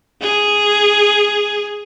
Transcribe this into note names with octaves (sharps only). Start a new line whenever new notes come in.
G#4